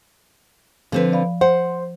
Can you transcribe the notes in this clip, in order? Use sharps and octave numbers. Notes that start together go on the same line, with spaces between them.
D3 F3 C4 B4
D5 F5 B5
C5 F#5